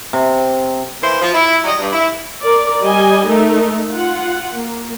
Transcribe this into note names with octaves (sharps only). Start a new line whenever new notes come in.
C3
E3 A#3 E4 C5
F3
E4
F#3 G3 D#5
G2
E4
A#4 D5
G3 D#5 G#5
A3 D#4 A#4
F4 F#5
A#3